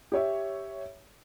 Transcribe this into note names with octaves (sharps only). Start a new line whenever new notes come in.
G4 C#5 E5